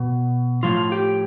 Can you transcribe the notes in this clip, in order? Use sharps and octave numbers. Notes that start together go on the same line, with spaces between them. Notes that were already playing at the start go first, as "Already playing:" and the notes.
Already playing: B2
A2 F3 F4
G4